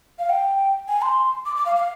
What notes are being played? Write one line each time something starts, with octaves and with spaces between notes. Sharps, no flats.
F5
G5
G#5
C6
D6
D6
F5
F5